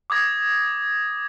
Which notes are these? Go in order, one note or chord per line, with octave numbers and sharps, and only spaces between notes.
D6 D#6 G#6 A#6